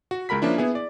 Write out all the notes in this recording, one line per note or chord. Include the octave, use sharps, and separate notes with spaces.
F#4
C#2 G#3 A#4 B5 B6
F3 A#3 C#4 D4 E4
B3 E4 G#4
D5